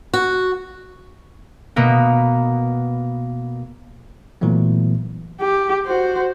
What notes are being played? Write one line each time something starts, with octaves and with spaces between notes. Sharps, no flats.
F#4
B2 A#3 B3
A#2 E3 F#3 A3 B3
G4
F#4 C5